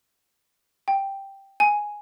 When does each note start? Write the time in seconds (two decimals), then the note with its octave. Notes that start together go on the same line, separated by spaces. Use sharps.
0.88 G5
1.60 G#5